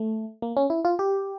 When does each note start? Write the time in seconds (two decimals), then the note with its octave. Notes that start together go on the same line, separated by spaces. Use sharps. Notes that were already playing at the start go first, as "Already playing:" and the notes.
Already playing: A3
0.42 A#3
0.57 C#4
0.70 E4
0.85 F4
0.99 G4